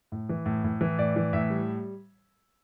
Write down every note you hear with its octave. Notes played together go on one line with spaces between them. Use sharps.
A2
E3
A2
A2
E3
A2 D5
E3
A2 E5
G3